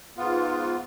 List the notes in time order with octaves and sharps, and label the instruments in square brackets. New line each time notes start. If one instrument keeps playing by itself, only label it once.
[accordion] G#2 B3 F4